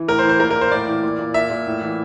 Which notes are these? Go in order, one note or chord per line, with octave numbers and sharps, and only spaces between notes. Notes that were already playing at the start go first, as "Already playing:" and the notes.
Already playing: E3
A2 A#4
C5
E3
C5
A#2 A#4
A#4
A#2
C5
A2 D5
E3
A#2
A#2
A#2 E5
A#2
A2
E3